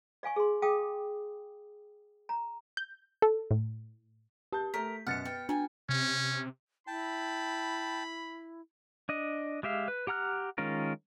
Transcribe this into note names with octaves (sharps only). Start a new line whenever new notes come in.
D5 F5 G#5 C#6
G#4 C6
G#4 F5 G5 A5 D6 D#6
A#5
G6
A4
A2
G4 A5 G6
A3 A#4 B6
F#2 B2 F#5 F6 A6 C#7
B3 G5
D4 G5 G#5
C3 C#4
E4 G5 A5 B5
D4 D#5
G#3 G4 E5 F5
B4
G4 F#5 A#5 F6 F#6
D#3 G#3 C#4 F4 A#4